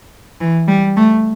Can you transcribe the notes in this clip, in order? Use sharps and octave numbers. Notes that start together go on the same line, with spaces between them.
E3
G3
A3